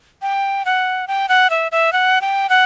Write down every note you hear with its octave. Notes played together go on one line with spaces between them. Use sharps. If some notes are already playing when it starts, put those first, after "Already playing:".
G5
F#5
G5
F#5
E5
E5
F#5
G5
F#5